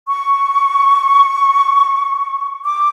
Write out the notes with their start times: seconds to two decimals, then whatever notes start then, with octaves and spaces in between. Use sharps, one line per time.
0.08 C#6
2.64 D6